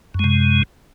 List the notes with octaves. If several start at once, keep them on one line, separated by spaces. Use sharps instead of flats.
F#2 C3 G#3